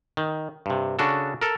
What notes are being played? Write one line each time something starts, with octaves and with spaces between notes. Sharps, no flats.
D#3
G2 C3
C#3 D4 F#4 A4
A4 A#4